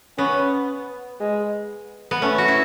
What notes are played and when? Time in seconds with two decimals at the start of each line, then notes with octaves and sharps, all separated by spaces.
0.18 B3 C#4
1.20 G#3
2.11 B3
2.21 A3 C#4
2.38 F#4
2.48 E4